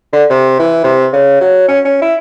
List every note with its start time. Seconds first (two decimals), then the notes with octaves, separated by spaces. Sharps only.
0.13 D3
0.30 C3
0.59 E3
0.84 C3
1.13 C#3
1.41 F#3
1.68 C#4
1.85 C#4
2.02 E4